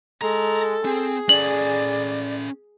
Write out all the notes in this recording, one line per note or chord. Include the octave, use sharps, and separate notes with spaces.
G#3 A4 A#5
C4 G#4
C#4 A4 D5 F#7